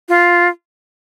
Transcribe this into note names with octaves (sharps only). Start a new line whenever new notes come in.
F4